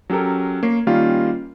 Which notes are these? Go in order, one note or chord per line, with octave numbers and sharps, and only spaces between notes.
F#3 C#4 G4 A4 A#4
A#3 C#5 C7
D#3 G3 A#3 C#4 F4